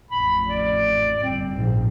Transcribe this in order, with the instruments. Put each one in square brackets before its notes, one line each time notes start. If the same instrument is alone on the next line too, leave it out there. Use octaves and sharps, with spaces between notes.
[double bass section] A1 F2 [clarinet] B5
[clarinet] D5
[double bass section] G1 [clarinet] C4
[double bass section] A#1 G#2 F3